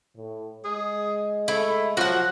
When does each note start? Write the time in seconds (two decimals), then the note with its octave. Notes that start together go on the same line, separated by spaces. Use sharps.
0.16 A2
0.65 G#3 G#4
1.48 A3 E4
1.97 F3 F#3 F#4 F#5